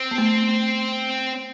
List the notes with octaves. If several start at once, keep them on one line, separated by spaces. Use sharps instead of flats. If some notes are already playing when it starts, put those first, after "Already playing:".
Already playing: C4
B3
A3